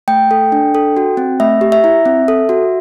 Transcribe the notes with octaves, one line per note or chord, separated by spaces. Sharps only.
A3 G5
A4
D4
A4
F#4
C4
A3 E5
G4
E5
E4
C4
A4
F#4